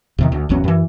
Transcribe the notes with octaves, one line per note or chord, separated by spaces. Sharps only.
E2 C3 D#3
D2
G#1 E2 F#3 C#4
F#2 E3